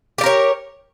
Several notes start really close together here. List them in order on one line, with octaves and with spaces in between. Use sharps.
G4 D5 A#4 C#5